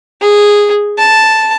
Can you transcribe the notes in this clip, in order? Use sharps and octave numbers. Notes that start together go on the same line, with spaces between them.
G#4
A5